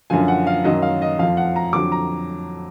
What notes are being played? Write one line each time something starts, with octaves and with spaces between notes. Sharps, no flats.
F#2 D3 F3 G#5
F#5
F5
F#2 D#3 F#3 D#5
F5
D#5
F2 F3 F5
F#5
A#5
F2 D3 F#3 D6
A#5